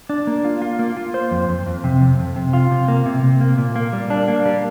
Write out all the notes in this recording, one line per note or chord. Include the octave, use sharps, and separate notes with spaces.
D4
A#3
F4
F4
A#3
F4
C5
F2
F2
F2
C3
F2
F2
C3
F4
C3
A#3
C3
C3
A#3
A#2
A#3
G3
D4
A#3
G3